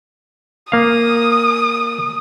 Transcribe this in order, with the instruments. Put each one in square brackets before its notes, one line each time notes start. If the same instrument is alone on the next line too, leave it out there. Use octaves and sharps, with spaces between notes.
[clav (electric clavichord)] A#3 F5 [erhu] D#6